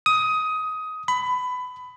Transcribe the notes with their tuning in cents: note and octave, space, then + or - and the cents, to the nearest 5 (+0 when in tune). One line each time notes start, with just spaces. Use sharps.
D#6 +15
B5 +20